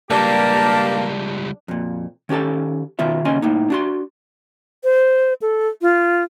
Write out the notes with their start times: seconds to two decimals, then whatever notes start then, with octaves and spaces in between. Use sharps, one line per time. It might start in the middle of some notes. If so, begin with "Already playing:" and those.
0.10 C#2 G2 G3 A#3 D4 G4 A5
1.68 F2 A#2
2.29 D#3 C#4 G4 A4 A5
2.99 B2 D#3 B3 F4 E5
3.25 D#2 C#3 C#4 D#5 G#5 C6
3.42 A2 A#3 D#4
3.70 D4 F#4 C6
4.84 C5
5.42 A4
5.82 F4